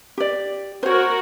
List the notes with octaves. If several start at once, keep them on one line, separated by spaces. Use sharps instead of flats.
G4 D5
F#4 A#4 C5 C#5